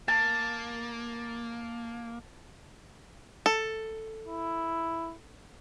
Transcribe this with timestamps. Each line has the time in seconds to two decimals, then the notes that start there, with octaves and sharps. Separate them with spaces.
0.08 A#3 A5
3.46 A4
4.26 E4